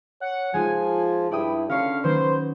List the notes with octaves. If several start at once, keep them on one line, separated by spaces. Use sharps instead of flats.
C#5 F#5
F3 G#3 D#4 F4 G#5
G2 E4 D5 G5 D#6
D3 C#4 C#5 F5 C#7
D#3 F#3 A#3 B4 C5